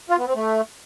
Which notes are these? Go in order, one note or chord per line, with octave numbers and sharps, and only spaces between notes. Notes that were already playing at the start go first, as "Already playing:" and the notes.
F4
B3
C4
A3